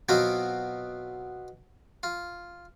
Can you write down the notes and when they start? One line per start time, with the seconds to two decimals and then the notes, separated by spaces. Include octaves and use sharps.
0.09 B2 F#3 B3 C4 F4 F#4
2.03 F4